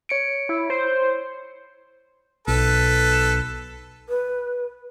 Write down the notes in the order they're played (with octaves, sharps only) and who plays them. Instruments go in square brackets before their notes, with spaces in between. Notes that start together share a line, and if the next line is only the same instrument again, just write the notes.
[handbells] C#5 C#7 D7
[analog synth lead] E4
C5
[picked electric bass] B1 [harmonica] A4 B4
[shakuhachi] B4